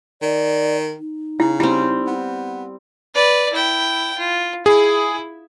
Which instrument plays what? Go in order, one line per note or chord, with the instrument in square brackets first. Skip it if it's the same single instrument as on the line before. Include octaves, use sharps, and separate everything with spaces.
[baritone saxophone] D#3 [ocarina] D5
[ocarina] D#4
[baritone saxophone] C#3 [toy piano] E4
[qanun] G3 C4 [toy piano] E4
[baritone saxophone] B3
[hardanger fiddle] B4 D5
E4 G5
F4
[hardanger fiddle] E4 [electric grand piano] G#4